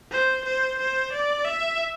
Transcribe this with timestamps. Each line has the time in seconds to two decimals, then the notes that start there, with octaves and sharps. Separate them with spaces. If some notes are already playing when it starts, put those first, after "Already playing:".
0.12 C5
0.45 C5
0.79 C5
1.12 D5
1.45 E5